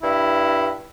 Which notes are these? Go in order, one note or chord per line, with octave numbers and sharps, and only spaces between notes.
G2 E4